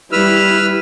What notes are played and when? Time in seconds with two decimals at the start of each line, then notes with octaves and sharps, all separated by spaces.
0.12 G3 E4 B4 E6 F6